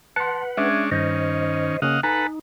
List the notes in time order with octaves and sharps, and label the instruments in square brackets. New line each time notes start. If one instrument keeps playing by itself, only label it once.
[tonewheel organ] B4 F#5 [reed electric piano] A5 C6
[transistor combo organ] G#3 C#4 D4 [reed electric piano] E5
[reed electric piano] G2 [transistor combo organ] D#3 C#4 [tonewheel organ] C5 D#5
[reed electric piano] C#3 A#3 C#4 [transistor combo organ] D#5 F5 F#5
[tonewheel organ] D#4 [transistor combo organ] A4 B4 F#5 [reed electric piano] G#5 A#5